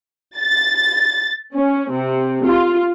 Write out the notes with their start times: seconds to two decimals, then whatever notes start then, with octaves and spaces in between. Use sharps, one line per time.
0.37 A6
1.54 C#4
1.92 C3
2.46 F4